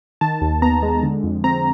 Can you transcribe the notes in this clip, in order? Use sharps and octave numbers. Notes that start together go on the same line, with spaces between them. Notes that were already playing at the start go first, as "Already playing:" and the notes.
D#3 A5
D#2
B3 A#5
G#3
D3
F2
C4 A#5